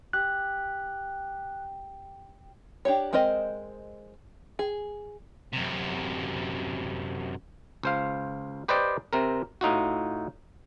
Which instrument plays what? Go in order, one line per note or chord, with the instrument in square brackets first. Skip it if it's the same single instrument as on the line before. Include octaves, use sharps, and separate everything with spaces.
[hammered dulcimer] G4 [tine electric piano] F#6
[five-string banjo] D4 G4 C#5
G#3 C4 A#4 C5 D#5
G#4
[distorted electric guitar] F#2 C3
[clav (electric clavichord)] C#2 C5 F5
G4 B4 C5 D5 D#5 G5
C3 C4 A#4
A2 D#4 F4 F#4